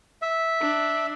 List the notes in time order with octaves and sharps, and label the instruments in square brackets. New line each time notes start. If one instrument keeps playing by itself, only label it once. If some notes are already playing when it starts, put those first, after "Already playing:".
[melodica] E5
[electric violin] D4